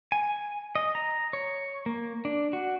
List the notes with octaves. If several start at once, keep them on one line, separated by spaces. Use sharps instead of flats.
G#5
D#5
A#5
C#5
A#3
D4
F#4